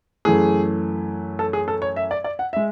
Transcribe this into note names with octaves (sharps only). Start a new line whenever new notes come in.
F#2 E3 A3 G#4
A4
G#4
A4
C#5
E5
D5
D5
F#5
G#3 E5